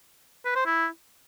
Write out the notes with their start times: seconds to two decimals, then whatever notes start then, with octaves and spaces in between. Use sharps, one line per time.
0.45 B4
0.55 C5
0.66 E4